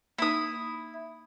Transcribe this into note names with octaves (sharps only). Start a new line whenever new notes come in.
A#3 D#4 E4 D#6